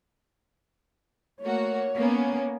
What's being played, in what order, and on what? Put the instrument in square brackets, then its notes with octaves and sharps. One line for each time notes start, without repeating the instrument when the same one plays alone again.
[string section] A3 A#3 F#4 [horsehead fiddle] C#5
[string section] A#3 B3 C#4